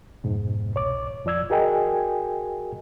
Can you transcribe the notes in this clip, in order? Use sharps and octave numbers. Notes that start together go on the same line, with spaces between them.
F2 G#2 B2
C2 C#5 D6
F2 F3 D5 E6 G#6
F#4 G#4 A#4 D#5 G5 G#5